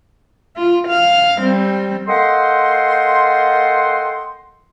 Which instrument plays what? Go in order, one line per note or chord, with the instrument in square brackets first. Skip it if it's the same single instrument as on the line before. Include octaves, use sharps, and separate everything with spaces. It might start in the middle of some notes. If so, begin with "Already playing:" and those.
[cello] F4
F5
G3 C4
[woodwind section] A#3 A4 D#5 F#5 G5 C6